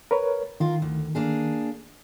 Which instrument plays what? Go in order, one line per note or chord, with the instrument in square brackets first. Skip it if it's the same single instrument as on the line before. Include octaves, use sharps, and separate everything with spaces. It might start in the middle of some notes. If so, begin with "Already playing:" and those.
[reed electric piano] A#4 B4 C#5
[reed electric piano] D#3 [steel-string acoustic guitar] F4 A#4
[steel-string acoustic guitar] D2
A#3 D4 G#4